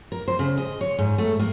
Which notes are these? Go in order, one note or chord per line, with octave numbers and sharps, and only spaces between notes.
A#4
C5
C#3
D#5
C#5
G#2
A3
A#3